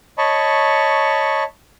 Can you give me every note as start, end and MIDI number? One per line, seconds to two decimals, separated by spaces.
0.18 1.43 73
0.18 1.43 75
0.18 1.43 81
0.18 1.43 83
0.18 1.43 85